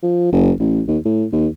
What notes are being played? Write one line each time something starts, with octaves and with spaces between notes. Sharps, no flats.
F3
F#1
A1
D#2
A2
D#2